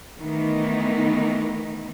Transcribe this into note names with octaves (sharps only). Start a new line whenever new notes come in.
D#3 E3 A3 B3 D#4